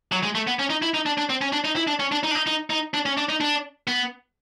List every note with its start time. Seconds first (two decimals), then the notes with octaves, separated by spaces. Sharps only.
0.12 F#3
0.23 G#3
0.35 A3
0.47 B3
0.59 C#4
0.70 D#4
0.82 E4
0.94 D#4
1.06 D4
1.18 D4
1.30 C4
1.41 C#4
1.52 D4
1.65 D#4
1.76 E4
1.87 D4
2.00 C#4
2.12 D4
2.23 D#4
2.31 D4
2.35 D#4
2.47 D#4
2.70 D#4
2.94 D4
3.06 C#4
3.17 D4
3.29 D#4
3.41 D4
3.87 B3